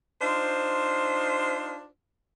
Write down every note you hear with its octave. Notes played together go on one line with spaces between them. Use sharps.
D4 D#4 F4 C5